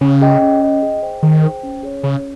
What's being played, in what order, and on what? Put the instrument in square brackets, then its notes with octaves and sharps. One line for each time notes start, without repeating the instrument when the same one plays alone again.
[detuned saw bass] C#3 [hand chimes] C#4
[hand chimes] G#4 D#5 G5
C#4
G#4 D#5 G5
G#4
C5 G5
[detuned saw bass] D#3 [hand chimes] G#4
[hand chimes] C5 G5
C#4
G#4 C#5
[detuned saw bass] C#3 [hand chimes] C#4